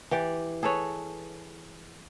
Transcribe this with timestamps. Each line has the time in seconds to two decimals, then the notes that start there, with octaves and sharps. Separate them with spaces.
0.11 E3 G4 D5
0.63 G#4 A4 B4 C#5